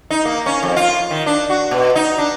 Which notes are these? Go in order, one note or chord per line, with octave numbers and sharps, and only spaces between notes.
D#4
A#3
C#4
F2
F4
D#3
D4
F#4
B2
D#4
D4